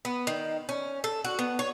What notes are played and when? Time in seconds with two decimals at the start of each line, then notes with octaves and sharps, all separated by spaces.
0.05 B3
0.27 D#3
0.69 C#4
1.04 A4
1.24 F#4
1.39 B3
1.59 C#5